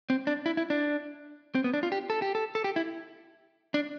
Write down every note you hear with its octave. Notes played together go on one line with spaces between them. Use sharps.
C4
D4
E4
E4
D4
C4
B3
D4
F4
G4
A4
G4
A4
A4
G4
E4
D4